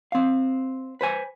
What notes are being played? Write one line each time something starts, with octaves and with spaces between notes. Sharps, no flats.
C4 F5
B4 C5 G#5